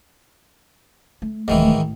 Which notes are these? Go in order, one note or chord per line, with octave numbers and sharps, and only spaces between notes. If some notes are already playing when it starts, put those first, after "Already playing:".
A3
D1 G#2 D#3 E3 A3
A1